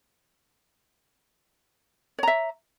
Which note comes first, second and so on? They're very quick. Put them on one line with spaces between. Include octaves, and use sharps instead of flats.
C#5 A#5 E5